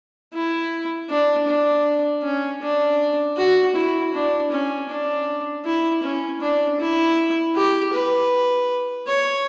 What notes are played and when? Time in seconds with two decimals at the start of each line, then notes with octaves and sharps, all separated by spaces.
0.34 E4
1.09 D4
1.47 D4
2.23 C#4
2.61 D4
3.37 F#4
3.75 E4
4.13 D4
4.51 C#4
4.89 D4
5.65 E4
6.03 C#4
6.41 D4
6.79 E4
7.55 G4
7.93 B4
9.07 C#5